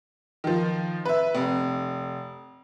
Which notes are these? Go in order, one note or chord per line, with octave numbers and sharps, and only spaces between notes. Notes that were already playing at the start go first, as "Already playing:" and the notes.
D#3 F3
B4 E5
F1